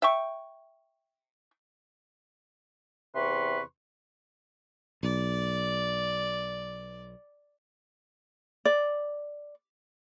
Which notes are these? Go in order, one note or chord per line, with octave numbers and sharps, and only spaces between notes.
E5 G5 C#6
E2 C3 B4 C6 C#6
B1 D5
D5